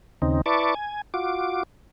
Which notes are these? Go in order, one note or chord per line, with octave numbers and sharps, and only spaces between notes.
D#2 C#3 C4 D#4
E4 B4 D5 A5 C#6 D6
G#5
F4 F#4 D6